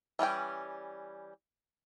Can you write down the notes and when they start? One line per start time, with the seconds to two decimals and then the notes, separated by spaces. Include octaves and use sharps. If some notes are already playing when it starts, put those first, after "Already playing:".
0.19 E3 G3 C#4 G5